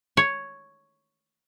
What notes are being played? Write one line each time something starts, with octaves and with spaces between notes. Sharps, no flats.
C#5